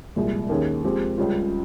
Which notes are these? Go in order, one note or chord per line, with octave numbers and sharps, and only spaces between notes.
C2 A#2 F3 G#3
D#2 D#3 A#3 C#4 G#4
F3 G#3 C4 G4
C#2 C#3 G3 C#4 F4